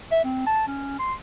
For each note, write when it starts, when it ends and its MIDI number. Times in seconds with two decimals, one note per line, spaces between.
0.12 0.20 76
0.24 0.45 60
0.46 0.65 81
0.67 0.96 61
0.99 1.14 84